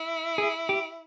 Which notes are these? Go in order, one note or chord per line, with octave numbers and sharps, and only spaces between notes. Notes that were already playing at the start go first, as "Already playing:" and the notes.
Already playing: E4
G#4
G4